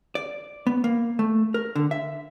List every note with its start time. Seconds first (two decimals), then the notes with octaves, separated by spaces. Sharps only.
0.15 D5
0.67 B3
0.84 A#3
1.19 A3
1.54 A#4
1.75 D3
1.91 E5